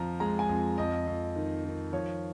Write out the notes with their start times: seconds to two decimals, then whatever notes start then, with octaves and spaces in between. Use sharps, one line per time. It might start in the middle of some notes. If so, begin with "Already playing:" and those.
Already playing: F2 F3 A#5
0.20 G#3 A#5
0.39 G#5
0.49 F2
0.78 F2 D#5
1.07 F2
1.36 D#3
1.65 D#3
1.93 F3 C#5